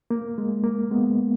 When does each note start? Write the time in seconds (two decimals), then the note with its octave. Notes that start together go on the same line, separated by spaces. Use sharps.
0.11 A#3
0.38 G#3
0.64 A#3
0.91 G#3 B3